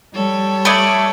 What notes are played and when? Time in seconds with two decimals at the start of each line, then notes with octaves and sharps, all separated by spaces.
0.15 G3 A4 C#5
0.65 A3 D5 B5 D#6 G#6